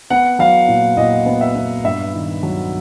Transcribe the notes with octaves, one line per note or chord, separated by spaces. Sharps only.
B3 F#5
F#3 F5
A#2
A#2 D#5
B3
E5
B3
G2 E5
D#3
F#3